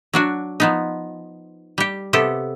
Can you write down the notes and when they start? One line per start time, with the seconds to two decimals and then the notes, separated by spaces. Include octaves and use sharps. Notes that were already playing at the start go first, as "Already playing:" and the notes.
0.13 F#3 D4 F#4
0.60 F3 B3 D#4
1.78 G3 G4
2.13 C3 B3 G4 A4